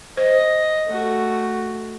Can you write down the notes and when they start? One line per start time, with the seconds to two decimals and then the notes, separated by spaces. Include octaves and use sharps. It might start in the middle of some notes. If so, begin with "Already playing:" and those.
0.17 C5 D#5
0.88 A3 F#4